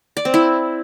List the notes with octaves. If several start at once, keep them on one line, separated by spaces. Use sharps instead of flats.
D5
C4
E4